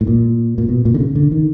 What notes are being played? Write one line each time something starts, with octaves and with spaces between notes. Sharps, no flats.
A2
A#2
A#2
B2
A#2
D3
C#3
D3
D#3